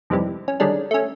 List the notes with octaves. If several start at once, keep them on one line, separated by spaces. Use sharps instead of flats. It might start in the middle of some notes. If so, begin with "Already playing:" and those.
F2 G#2 C3 E3 G3
C#4
D3 D#3 G3 G#3 C#4 D4
A3 C#4